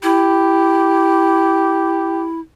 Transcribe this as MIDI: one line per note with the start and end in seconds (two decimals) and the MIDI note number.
0.03 2.40 64
0.03 2.27 67